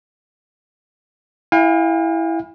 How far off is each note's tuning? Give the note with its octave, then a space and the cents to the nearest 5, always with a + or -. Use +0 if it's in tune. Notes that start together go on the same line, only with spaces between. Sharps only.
E4 +0 F5 +30 G#5 -45